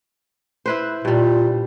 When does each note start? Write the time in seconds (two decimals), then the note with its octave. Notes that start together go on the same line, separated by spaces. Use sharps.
0.66 E4 B4 C5
1.05 G2 A#2 G3